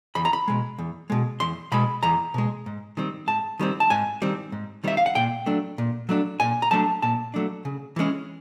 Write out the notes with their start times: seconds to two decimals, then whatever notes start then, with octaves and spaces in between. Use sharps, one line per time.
0.15 E2 B5
0.25 A#5
0.33 B5
0.48 B2 G#3
0.78 E2
1.10 B2 G#3
1.40 E2 C6
1.72 B2 G#3 B5
2.03 E2 A#5
2.34 B2 G#3
2.66 G#2
2.97 D#3 G3 C4
3.27 G#2 A5
3.59 D#3 G3 C4
3.80 A5
3.90 G#2 G#5
4.22 D#3 G3 C4
4.52 G#2
4.84 D#3 G3 C4 E5
4.97 F5
5.06 F#5
5.15 A#2 G5
5.46 F#3 A3 D4
5.78 A#2
6.09 F#3 A3 D4
6.40 A#2 G#5
6.62 A#5
6.71 F#3 A3 D4 A5
7.02 A#2 A5
7.34 F#3 A3 D4
7.65 C#3
7.96 E3 G#3 C#4